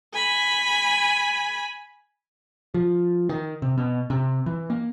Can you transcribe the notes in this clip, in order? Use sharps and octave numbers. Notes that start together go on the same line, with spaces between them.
G#5 B5
F3
D#3
C3
B2
C3
E3
A#3